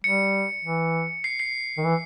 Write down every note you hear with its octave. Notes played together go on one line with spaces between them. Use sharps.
G3 C#7
E3
C7
C7
D#3
E3